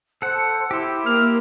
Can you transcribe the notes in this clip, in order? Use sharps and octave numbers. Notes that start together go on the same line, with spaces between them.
A4 C5 F#5
E4 G4 C5
A#3 F6